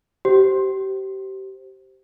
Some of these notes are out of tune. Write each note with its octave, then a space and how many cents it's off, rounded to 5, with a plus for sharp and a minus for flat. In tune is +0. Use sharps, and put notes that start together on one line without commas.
G4 -30 C5 +0